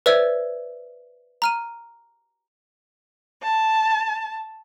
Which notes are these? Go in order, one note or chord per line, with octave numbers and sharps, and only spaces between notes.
B4 C5 D5 E5 E6 G#6
A#5 F6 D#7
A5